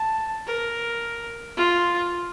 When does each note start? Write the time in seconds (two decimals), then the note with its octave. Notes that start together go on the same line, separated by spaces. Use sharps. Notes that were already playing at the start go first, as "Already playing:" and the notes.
Already playing: A5
0.46 A#4
1.57 F4